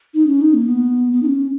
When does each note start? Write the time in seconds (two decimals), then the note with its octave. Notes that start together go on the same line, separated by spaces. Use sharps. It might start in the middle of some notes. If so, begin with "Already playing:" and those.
0.14 D#4
0.27 C#4
0.41 D#4
0.54 A#3
0.68 B3
1.13 B3
1.23 D#4
1.26 C#4